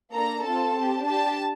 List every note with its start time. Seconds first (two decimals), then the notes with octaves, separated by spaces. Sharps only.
0.12 A#3 D4 A4 A#5
0.43 C4 F4 A4 A5
0.74 C4 G4
1.04 D4 G4 A5